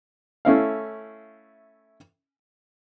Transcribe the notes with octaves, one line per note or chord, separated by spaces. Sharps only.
A3 C#4 E4 F5